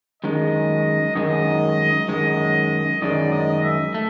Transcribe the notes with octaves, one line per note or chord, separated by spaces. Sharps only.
F#2 D#3 G#3 D#5
F#2 D#3 G#3 D#5
F#2 D#3 G#3
F#2 D#3 G#3 D5
D#5
E5
A3